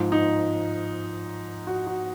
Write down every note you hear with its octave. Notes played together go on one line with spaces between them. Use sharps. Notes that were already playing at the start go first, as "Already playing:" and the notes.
Already playing: G#2 F3
D#4
F#4
F#4